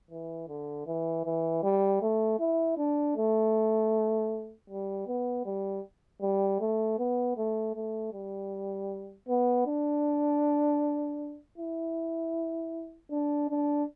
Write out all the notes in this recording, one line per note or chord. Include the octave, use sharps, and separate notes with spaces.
E3
D3
E3
E3
G3
A3
E4
D4
A3
G3
B3
G3
G3
A3
B3
A3
A3
G3
B3
D4
E4
D4
D4